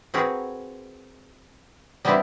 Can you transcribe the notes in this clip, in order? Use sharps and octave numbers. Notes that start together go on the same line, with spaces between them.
C4 F#4 G#4 A#4 B4
G3 B3 C4 D4 E4 G4